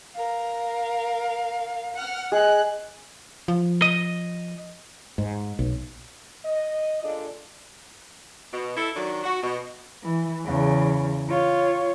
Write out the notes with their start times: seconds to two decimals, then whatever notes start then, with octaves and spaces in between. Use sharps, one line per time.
0.13 A#4 F5
1.93 F#5 F6
2.32 G#4 D#5 F#6
3.48 F3
3.82 D#5
5.18 G#2
5.59 B1
6.45 D#5
7.03 A#2 D4 F4 G#4 A4 D5
8.52 B2
8.77 E4 A4
8.95 D#3 F#3 D4
9.24 F#4
9.42 B2
10.03 E3
10.44 E2 C#3
11.29 F4 C#5